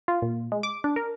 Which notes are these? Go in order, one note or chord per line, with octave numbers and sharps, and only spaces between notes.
F4
A#2
G#3
D6
D4
A#4